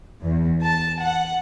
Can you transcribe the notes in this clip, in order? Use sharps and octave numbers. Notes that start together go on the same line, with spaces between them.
E2
A5
F#5